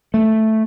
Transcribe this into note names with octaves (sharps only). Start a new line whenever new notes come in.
A3